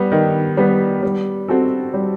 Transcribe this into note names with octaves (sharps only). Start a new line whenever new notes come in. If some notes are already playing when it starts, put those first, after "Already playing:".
Already playing: G3 B3
D#3
G3 B3
G3
C4 F#4 A4
G3